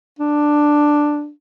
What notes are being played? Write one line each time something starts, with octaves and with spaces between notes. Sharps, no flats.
D4